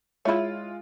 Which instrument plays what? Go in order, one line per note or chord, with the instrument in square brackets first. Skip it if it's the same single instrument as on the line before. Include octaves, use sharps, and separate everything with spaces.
[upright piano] G#3 F4 [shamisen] E4 C#5 [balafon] E5 B5